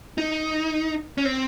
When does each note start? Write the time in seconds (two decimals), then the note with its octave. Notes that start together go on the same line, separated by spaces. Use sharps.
0.18 D#4
1.18 C#4
1.25 C4